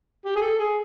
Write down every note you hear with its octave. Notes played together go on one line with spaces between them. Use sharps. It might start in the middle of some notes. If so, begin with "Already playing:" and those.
G4
G#4
A4
G#4